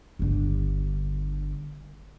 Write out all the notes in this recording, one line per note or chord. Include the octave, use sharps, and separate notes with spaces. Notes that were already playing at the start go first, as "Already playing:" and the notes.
G1 D3